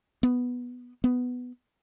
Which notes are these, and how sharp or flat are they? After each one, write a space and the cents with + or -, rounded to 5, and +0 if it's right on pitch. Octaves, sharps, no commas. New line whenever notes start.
B3 +0
B3 +5